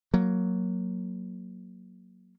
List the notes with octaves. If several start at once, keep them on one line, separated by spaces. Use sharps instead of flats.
F#3 A#3